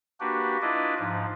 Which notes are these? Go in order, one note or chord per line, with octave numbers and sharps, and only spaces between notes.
A#3 D4 F#4 G4 B4
D4 E4 F4 B4 D5 D#5
G#2 F3